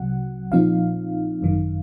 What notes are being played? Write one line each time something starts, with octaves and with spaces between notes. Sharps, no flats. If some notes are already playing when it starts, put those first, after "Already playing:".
Already playing: C2 C3 F#3 F#5
A#1 A#2 F3 C4 D#4 F5
G#1 F#2 D#3